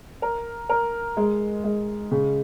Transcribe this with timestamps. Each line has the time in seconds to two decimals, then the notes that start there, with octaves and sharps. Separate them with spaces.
0.22 A#4
0.69 A#4
1.17 G#3
1.64 G#3
2.11 C#3